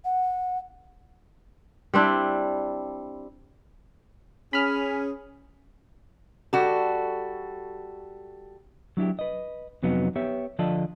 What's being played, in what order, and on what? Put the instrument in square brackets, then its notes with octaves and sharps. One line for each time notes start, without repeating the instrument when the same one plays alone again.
[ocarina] F#5
[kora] G3 C4 D4 E4
[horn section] C#4 G#4 [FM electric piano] B5 F6
[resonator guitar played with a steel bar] G3 F#4 A4
[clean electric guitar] F#3 D4 E4 G4
B4 D#5
F2 C3 F#3 B3 C#4 D#4
B3 G4 C#5 E5
D3 F3 F4 A4 D5 D#5